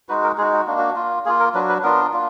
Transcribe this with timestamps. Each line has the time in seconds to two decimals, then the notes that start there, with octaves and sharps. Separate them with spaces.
0.09 G#3 D#4 F#4 B4
0.23 A#4
0.38 G#3 D#4 F#4 G#4
0.53 F#4
0.67 A#3 D4 F#4
0.78 F#4
0.96 A#3 F4
1.25 A#3 F4 G#4
1.40 A#4
1.54 F#3 D4 F#4 B4
1.69 B4
1.83 B3 D4 F4 A#4
2.13 A#3 D4 F4